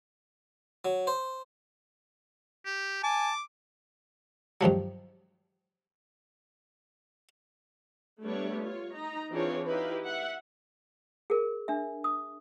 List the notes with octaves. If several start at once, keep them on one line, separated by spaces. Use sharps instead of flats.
F#3
C5
G4
G#5 A5 D6
G2 D#3 F3 F#3
G3 A3 B3 D4 C#5
F4 C#5
D#4 A#5
E3 C4 D4 F4 G#4 C#5
D#4 E4 G4 B4 F5
E5 F#5
G#4 A#4
D4 E5
D#6